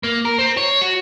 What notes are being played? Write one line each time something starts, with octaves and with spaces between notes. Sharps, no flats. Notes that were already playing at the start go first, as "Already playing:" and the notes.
A#3
A#4
C4
C#5
F#4